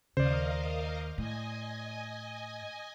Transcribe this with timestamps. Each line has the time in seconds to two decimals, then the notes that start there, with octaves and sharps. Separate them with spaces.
0.17 D#2 C#3 A#4 C5 D5 D#5 F5
1.18 A2 D#5 G#5